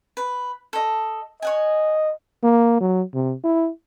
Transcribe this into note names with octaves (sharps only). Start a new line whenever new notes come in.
B4
A4 D#5
C#5 D#5 F#5 G#5
A#3
F#3
C3
E4